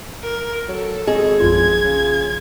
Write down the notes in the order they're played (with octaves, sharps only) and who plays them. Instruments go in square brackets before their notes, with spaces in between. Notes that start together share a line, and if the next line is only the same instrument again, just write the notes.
[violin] A#4
[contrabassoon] F#3 [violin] A4
[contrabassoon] G#1 [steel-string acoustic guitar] G#4 [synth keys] D#5 C#6
[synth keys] A#1 F#2 F4 [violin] G#6
[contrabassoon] C#3